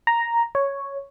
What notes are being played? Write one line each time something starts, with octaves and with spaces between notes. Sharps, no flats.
A#5
C#5